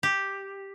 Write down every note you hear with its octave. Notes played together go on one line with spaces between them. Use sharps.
G4